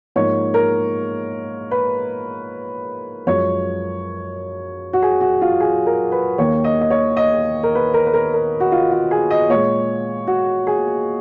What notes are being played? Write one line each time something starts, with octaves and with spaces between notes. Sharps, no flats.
G#2 F3 A#3 C#5
A#4
B4
F#2 F3 G#3 C#5
F#4
G#4
F#4
F4
G#4
A#4
B4
D#2 D#3 A#3 C#5
D#5
D#5
C#5
D#5
A#4
B4
A#4
B4
A#4
A#4
F#4
F4
F4
G#4
D#5
A#2 G#3 C#5
F#4
G#4